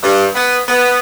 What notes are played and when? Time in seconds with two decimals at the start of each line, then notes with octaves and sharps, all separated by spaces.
0.03 G2
0.35 B3
0.69 B3